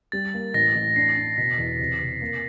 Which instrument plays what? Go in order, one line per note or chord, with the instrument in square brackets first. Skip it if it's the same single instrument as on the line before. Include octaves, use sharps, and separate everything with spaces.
[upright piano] G3 [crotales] A6
[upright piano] A#3
[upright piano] A1 [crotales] A#6
[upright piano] A1
[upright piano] D4 [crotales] C7
[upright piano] D4
[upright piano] B2 [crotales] B6
[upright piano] E2
C3
C3
A#3